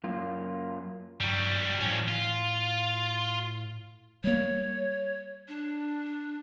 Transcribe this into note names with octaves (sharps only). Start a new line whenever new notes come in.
F#2 A#3 F4
G2 F#3 G3
F2 A2 C#4
F4
G3 A#3 C#5
D4